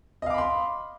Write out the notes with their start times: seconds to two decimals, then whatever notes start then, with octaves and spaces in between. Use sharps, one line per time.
0.22 D#5
0.26 F5
0.30 D6
0.34 B5
0.38 C6